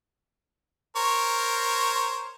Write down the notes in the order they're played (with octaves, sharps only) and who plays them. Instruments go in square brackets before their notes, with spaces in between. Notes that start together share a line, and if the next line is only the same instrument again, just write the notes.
[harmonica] A#4 C5 C#5